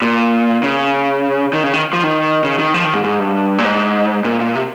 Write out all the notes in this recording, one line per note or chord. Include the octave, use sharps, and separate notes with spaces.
A#2
C#3
D#3
C#3
D#3
F3
D#3
C#3
D#3
F3
D#3
G#2
G#2
G2
A#2
G#2
A#2
A#2
C3